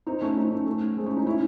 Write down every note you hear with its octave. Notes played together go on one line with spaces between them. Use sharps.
C4 D#4
A3 C#4
C4 D#4
A3 C#4
A3 C#4
G#3 C4
A3 C#4
C4 D#4
C#4 E4